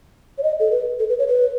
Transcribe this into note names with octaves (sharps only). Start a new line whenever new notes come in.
C#5
D#5
A4
B4
A4
B4
C#5
B4